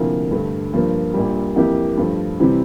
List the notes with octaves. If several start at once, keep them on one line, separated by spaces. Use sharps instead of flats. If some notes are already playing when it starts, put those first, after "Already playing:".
Already playing: D2 C3 F3 A#3 E4
G2 D3 A3
G2 F3 A#3
A#1 A#2 G3
F2 E3 A#3 E4 G4
G2 F3 A3
C3 E3 G3 C4